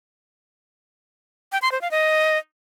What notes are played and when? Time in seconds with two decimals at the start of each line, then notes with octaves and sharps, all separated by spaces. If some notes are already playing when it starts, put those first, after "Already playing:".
1.52 G5
1.62 C6
1.72 C5
1.81 F5
1.91 D#5